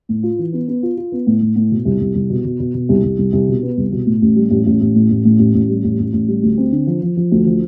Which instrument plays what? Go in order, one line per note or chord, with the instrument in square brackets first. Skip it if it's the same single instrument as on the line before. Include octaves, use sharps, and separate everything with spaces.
[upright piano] A2
F4
E3
B3
B3
F4
F4
B3
A2
A2
A2
B2
C2
C2
C2
B2
B2
B2
B2
C2
C2
C2
C2
B2
B3
C2
B2
A2
A1
G3
A1
A1
A1
A2
A1
A2
A1
A1
G3
A1
A1
A1
G3
D2
C4
D3
F3
F3
F3
D2
F3